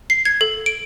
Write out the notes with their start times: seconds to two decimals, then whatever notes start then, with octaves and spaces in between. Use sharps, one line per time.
0.10 C7
0.25 G#6
0.41 A4
0.66 D7